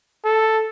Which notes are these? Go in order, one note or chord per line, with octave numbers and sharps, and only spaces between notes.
A4